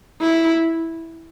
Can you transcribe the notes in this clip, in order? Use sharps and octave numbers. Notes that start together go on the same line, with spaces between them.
E4